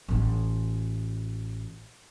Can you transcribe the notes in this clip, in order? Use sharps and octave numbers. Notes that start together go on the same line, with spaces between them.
A1 F4